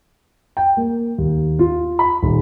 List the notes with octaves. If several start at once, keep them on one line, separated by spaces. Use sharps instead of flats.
G5
A#3
D#2
F4
B5
D#1